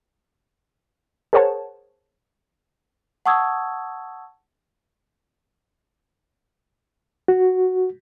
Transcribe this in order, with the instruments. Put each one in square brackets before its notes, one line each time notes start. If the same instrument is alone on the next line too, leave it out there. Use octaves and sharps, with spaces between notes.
[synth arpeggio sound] G#4 A#4 C5 C#5 F#5 A5
[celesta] F#5 A5 C#6 D#6 E6 G#6
[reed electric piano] F#4